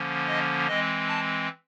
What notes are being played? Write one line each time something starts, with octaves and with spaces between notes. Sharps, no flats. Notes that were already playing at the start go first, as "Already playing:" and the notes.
Already playing: D3 F3 A#3 C#4
D#5
E3 G#3 C4 D#5
A5